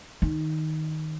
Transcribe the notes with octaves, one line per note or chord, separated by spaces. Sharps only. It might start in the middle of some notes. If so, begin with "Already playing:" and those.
D#3